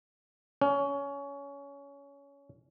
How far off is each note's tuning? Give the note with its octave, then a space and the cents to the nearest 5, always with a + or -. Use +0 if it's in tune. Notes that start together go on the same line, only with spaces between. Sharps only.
C#4 +20